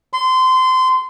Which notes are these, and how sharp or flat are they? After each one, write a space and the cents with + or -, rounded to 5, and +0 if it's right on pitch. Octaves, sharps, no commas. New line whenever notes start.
C6 -25